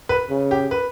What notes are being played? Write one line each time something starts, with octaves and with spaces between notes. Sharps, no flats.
B4
C#3
G4
B4